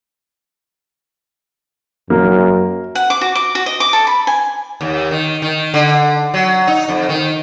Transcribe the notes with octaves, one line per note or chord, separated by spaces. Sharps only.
F#2 A#3
F#5
D6
F#4
D6
F#4
D#5
D6
A4
B5
G#5
D#2
D#3
D#3
D3
F#3
D#4
F2
D#3